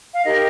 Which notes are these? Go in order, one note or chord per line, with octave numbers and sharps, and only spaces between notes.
F5
D#4 G4 A#4 D#5